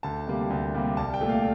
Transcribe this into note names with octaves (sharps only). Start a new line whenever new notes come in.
D2 A5
C3 G3 A#3
D2
C3 G3 A#3
C2 A5
G5
A#2 A3
F5